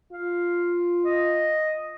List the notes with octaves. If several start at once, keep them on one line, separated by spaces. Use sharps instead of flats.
F4 F5
D#5